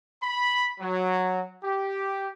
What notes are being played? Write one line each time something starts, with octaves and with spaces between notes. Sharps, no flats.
B5
F#3
G4